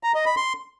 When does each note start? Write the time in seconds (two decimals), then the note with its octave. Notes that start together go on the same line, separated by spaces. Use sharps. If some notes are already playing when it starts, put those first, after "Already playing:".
0.03 A#5
0.14 D#5
0.26 B5
0.37 C6